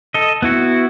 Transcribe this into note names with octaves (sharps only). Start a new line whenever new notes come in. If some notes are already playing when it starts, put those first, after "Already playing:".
A4 D#5
B3 E4 F#4